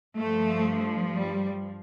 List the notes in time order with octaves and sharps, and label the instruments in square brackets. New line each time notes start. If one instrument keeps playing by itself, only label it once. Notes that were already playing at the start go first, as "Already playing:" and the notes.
[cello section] G2 F3 A3
G3